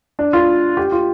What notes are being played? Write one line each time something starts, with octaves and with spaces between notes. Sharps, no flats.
D4
F4
G4
F4